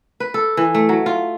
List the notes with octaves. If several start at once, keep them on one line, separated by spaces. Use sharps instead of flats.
B4
A4
E3
A3
F#3
F4